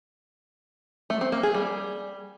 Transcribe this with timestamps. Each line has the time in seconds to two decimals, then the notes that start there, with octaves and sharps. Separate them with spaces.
1.10 A3
1.21 C4
1.32 A#3
1.43 G#4
1.54 G3